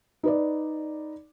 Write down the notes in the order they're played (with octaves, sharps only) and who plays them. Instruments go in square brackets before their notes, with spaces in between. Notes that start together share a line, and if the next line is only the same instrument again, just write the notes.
[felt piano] D#4 B4 D5